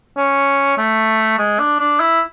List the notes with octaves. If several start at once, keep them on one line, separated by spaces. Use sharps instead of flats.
C#4
A3
G#3
D4
D4
E4